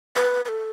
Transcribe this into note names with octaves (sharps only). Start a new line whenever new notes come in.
B4
B4
A4